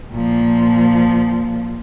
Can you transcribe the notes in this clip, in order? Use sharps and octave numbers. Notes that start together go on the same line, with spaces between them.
A#2 F3